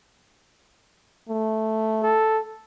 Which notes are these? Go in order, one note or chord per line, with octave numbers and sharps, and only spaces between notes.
A3
A4